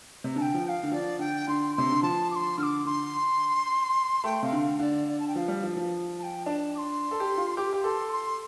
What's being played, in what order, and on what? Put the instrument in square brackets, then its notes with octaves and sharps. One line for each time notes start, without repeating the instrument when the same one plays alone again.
[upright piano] C3
[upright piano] D3 [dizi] A5
[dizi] G5
[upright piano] F3
[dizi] G5
F5
[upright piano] D3
[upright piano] F3 [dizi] D5
[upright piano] D3 [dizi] G5
[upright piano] D3 [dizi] C6
[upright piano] C3 [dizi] C6
[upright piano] D3
[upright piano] F3 [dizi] A5
[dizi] D6
C6
[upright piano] D3 [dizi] F6
[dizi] D6
[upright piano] D3 [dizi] C6
[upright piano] A3 [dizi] G5
[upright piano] C3 [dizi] F5
[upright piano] D3
[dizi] F5
[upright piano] D3 [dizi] D5
[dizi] D5
A5
G5
[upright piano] F3 [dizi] F5
[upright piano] G3
F3
F3
[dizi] A5
G5
[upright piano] D4 [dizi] A5
[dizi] D6
C6
[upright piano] A4
G4
F4
[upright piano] G4 [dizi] D6
[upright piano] G4
[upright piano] A4 [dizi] C6
[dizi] C6